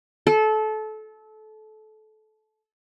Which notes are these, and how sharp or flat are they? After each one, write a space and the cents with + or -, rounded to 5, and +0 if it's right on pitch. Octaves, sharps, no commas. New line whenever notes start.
A4 -25